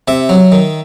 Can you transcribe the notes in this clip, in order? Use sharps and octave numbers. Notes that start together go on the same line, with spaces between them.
C3 E5
F#3
D#3